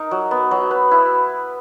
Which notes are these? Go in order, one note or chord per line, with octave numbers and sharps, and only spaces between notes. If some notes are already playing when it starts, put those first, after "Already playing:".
Already playing: D#4 A#4
F#3
B3
F#3
B4
E4